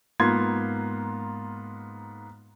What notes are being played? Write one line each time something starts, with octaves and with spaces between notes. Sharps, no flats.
G#2 A#3 B3 F4 C6 G#6